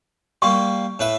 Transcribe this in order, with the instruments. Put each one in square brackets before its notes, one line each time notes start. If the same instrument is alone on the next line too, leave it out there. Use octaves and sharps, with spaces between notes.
[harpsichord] G3 A#3 [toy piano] C#6
[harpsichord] A2 B4 E5